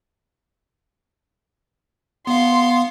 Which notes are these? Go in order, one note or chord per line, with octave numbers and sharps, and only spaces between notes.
B3 F5 C6